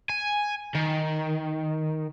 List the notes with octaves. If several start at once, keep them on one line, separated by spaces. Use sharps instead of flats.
G#5
D#3